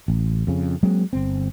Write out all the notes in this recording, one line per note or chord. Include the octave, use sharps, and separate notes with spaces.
A1
F2 C#3
F#3 G#3 A#3 C4
G1 C4